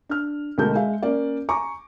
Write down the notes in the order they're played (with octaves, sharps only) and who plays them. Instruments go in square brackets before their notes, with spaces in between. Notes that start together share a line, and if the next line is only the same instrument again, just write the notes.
[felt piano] D4 F6
D2 B2 G#3 A#4 A5 G6
G#3 E5 F5 G#5
A#3 C#4 D5
G#5 A#5 C#6 D6